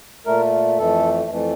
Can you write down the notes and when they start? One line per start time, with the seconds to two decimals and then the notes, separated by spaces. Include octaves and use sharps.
0.26 A#2 A3 A#4
0.78 F2 E3 A3 A4
1.30 F2 E3 A3